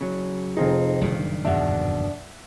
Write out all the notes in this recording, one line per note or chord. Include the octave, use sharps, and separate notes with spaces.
C#3 F#3
F1 C4 D#4 F4 G#4
F#1 G2 A#2 D#3
E2 G2 B2 D4 E5 F#5